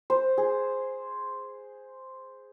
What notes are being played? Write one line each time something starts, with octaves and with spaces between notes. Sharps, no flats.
C5
G#4